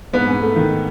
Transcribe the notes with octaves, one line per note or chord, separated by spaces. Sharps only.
G#2 B3
G#2
A3
D#3